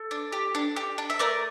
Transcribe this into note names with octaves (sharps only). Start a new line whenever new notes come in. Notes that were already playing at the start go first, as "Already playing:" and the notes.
Already playing: A4
D4
G4
D4
G4
D4
E5
A3 A#4 D5